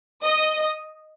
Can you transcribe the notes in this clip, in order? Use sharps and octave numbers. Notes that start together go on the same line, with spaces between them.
D#5